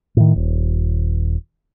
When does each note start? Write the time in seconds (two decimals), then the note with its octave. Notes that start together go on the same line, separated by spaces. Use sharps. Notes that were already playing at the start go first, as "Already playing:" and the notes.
0.17 A2 D#3
0.36 D#1